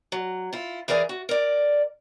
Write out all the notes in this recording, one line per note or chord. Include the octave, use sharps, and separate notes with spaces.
F#3
E4 F4
E3 G#4 A#4 D5 G#5
F#4
A#4 D5